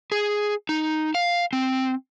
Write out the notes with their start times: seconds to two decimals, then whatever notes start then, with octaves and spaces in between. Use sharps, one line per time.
0.12 G#4
0.69 D#4
1.15 F5
1.53 C4